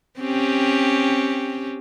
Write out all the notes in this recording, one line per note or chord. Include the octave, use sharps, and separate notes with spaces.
C4 C#4 G4